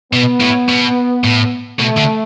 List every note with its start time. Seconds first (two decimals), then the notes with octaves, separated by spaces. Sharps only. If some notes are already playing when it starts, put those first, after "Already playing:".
0.13 B2 B3
0.40 A2
0.69 B2
1.24 A2
1.79 B2 A3
1.98 D3